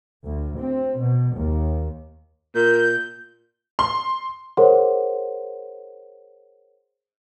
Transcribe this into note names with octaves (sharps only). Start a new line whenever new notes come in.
D2
C4
B2
D#2
A#2 G6
C6
G#4 A#4 C5 C#5 F#5 C6